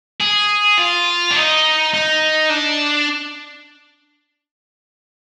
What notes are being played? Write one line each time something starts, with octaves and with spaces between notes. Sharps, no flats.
G#4
F4
D4
D#4
D#4
D4